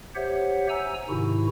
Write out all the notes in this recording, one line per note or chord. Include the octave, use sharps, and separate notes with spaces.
G4 C5 C#5 E5 F#5
G#5 A#5 E6
G#2 C3 D#3 E4 F#4